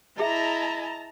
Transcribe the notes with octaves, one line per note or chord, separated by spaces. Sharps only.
E4 G#4 D#5 E5 A5 A#5